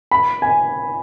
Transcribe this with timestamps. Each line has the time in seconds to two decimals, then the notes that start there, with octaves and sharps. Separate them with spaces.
0.11 B5
0.42 G#5